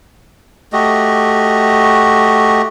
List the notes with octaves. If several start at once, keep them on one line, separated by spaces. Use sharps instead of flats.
A3 F#4 G4 D#5